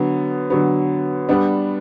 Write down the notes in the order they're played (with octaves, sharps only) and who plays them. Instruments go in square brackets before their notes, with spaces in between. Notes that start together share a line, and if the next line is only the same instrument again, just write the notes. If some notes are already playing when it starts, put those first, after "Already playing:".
Already playing: [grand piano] D3 F#3 B3
D3 F#3 B3
G3 B3 D4